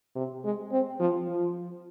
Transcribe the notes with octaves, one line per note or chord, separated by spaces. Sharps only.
C3
G#3
C4
F3
F3